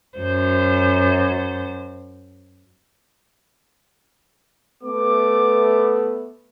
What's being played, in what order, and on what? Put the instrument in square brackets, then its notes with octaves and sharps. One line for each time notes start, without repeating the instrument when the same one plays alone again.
[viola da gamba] F#2 C5
[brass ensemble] A3 B3 [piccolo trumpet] D6